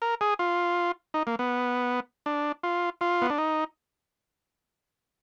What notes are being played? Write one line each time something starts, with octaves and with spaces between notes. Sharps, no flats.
A#4
G#4
F4
D#4
A#3
B3
D4
F4
F4
B3
D4
D#4